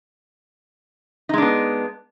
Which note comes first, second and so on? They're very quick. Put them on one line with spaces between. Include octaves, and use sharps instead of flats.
D#4 G#3 D4 B3